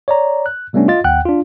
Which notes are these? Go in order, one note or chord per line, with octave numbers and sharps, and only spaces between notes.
C#5 D5 A#5
F#6
C3 G3 A3 B3 C#4 D4
F4 D#5 A6
D#2 F#5 G5 F#6
D4 F4